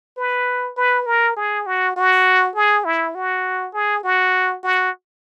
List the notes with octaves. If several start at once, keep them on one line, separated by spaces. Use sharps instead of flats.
B4
B4
A#4
G#4
F#4
F#4
G#4
E4
F#4
G#4
F#4
F#4